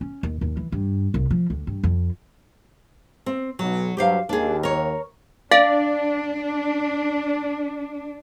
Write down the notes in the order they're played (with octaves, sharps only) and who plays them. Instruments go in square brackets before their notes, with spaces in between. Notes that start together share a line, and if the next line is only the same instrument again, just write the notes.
[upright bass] C#4
D#2
D#2
E3
G2
C2
F3
D2
G2
F2
[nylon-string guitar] C4
[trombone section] B1 [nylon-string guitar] F#3
[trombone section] G2 F#3 [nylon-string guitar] G4 C5 F5
[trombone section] D#2 [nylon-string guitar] D4 G#4
[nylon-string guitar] A#4 C#5
[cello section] D4 [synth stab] D5 [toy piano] F5